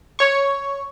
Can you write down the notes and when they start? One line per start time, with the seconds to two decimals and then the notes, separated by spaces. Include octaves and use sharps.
0.19 C#5 C#6